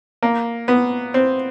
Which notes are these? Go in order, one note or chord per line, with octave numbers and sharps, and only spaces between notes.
A#3
B3
C4